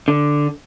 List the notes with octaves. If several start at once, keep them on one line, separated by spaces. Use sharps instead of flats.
D3